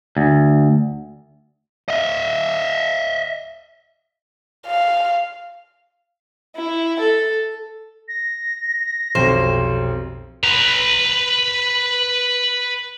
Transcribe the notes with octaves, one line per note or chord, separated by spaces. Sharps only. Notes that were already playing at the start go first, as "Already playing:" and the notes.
D2
D#5 E5
F5
E4
A4
A#6
B1 F2 C3 C5
B4 A#5